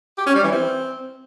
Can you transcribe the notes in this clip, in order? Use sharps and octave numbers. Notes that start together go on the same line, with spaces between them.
G4
C#4
G3
E3
C4